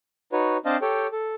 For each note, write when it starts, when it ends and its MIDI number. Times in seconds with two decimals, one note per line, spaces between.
0.32 0.57 63
0.32 0.57 66
0.32 0.57 71
0.32 0.57 73
0.66 0.77 60
0.66 0.77 62
0.66 0.77 72
0.66 0.77 75
0.66 0.77 77
0.66 0.77 81
0.82 1.07 67
0.82 1.07 69
0.82 1.07 73
0.82 1.07 79
1.12 1.35 69